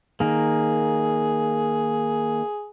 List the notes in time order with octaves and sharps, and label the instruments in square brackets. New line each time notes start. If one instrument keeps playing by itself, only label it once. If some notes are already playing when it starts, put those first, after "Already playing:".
[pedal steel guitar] D#3 A#3 [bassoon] G#4